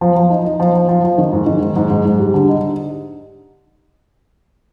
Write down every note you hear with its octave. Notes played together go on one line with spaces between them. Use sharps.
F3
F3
D#4
D#4
F3
F3
F3
F3
D#3
G#2
D#3
G#2
G#2
G#2
G#2
G3
D3
D#4